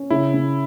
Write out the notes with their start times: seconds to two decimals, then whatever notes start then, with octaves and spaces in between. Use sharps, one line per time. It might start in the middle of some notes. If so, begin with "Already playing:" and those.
Already playing: C#4
0.10 C#3 E4
0.34 C#3